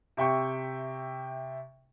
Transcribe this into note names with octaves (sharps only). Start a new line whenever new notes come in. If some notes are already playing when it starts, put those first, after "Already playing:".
C3 E5 G5 C#6